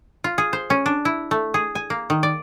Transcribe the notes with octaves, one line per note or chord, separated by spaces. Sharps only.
F4
G#4
C5
C#4
D4
E4
A3
G#4
G#5
A#3
D#3
D5